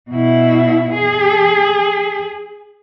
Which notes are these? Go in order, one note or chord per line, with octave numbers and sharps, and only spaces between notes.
B2 E4
G#4